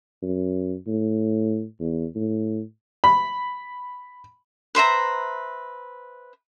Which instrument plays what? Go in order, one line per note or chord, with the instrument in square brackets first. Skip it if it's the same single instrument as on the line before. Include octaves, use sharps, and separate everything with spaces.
[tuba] F#2
A2
E2
A2
[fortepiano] B5
[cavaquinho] B4 C5 E5 A#5